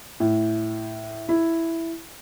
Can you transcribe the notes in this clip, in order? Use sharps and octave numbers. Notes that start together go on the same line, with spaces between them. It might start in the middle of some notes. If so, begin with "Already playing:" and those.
A2
E4